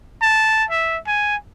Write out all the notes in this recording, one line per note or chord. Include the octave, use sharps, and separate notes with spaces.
A5
E5
G#5